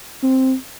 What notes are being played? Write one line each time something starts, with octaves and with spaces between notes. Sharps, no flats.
C4